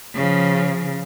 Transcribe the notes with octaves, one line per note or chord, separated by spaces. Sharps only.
C#3 F3